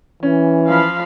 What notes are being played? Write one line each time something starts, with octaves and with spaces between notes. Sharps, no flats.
E3 C#4
F3 F5 B5